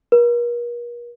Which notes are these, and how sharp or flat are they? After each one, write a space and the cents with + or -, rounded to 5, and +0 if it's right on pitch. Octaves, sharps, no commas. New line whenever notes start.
A#4 +40